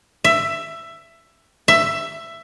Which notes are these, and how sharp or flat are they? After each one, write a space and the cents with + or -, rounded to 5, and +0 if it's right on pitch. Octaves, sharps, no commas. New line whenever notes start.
E5 +15
E5 +15